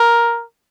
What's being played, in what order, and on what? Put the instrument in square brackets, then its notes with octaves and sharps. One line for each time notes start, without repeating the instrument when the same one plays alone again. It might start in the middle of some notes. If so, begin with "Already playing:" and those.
Already playing: [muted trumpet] A#4